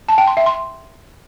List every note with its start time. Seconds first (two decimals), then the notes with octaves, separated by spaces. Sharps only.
0.08 A5
0.18 G5
0.27 C6
0.37 E5
0.46 C6